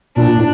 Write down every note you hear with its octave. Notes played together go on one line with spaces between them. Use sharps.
A#2 D4
A#2
A2